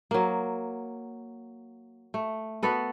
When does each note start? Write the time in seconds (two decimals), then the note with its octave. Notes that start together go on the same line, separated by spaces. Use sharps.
0.11 F#3 A#3
2.14 A3
2.63 B3 F#4 A4 B4